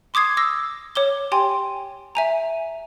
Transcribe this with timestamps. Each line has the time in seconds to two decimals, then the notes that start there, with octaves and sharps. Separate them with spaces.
0.14 C6 D6 D#6 G#6 C7
0.37 D6 E6 A#6
0.95 C#5 D6 G7
1.32 G4 G5 G#5 C6
2.15 E5 G#5 A#5